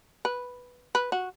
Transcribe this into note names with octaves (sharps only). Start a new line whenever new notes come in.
B4
B4
F#4